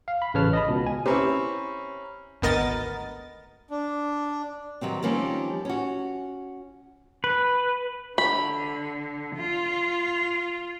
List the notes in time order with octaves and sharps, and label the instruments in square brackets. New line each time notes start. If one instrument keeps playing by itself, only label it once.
[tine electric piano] F5
B5
A1 C#3 B4 C#5 A5 F6
D#5 A5 B5
C#2 B2
G#5
[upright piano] C4 C#4 E4 [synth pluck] G4 B4 [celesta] C#5 A#5 B5
[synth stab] G#1 D2 B3 A#4 D#5 A6
[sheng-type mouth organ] D4
[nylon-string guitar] D#3 F#3 G3 C4
D#3 F3 G3 A#3 C4 C#4
C#4 F#4
[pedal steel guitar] B4
[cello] D3 [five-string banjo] B5
[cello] F4